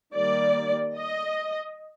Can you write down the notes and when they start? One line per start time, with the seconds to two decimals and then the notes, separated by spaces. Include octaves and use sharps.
0.14 D#3 G3 A#3 D5
0.97 D#5